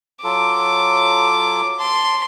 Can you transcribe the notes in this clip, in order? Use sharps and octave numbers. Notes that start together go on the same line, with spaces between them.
F#3 F4 A4 D6
A5 C6